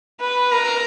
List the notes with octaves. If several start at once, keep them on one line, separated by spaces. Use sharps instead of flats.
B4
A#4